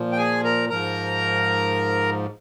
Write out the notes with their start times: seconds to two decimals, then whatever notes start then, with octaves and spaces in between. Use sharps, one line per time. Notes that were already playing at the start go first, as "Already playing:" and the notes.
Already playing: A#2 F3
0.12 G5
0.17 G#4 G#5
0.44 A#4 A#5
0.69 G#2 F3 A#4 A#5